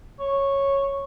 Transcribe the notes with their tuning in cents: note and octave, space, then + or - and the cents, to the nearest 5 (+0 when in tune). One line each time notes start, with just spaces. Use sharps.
C#5 -10